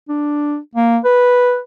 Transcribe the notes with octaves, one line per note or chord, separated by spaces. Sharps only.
D4
A#3
B4